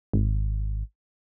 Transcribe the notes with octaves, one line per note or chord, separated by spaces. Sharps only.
G#1